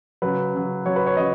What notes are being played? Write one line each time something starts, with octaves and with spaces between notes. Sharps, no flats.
C#3 F#3 B4
C#3 F#3
C#3 F#3 C#5
B4
C#5
C#3 F#3 D#5